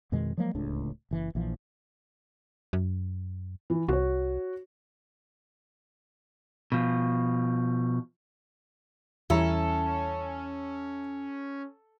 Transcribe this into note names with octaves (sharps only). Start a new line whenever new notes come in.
F2 B2 D#3 G#3
F3 F#3 G#3 A#3
D1 C#2 A2 D4
F#1 E3
A#1 E3 F3
F#2
E3
C2 F#4 C#5
B2 F3
E2 E3 G3 C#4 E4 A4 A#5